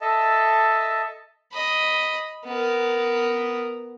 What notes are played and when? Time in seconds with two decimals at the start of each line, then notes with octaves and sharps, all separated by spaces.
0.01 A4 D#5 E5 A5
1.52 D#5 B5
2.45 B3 A#4